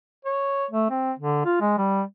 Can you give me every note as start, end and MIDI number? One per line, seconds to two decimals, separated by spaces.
0.25 0.65 73
0.71 0.88 57
0.90 1.12 60
1.19 1.43 50
1.45 1.60 65
1.61 1.76 56
1.78 2.02 55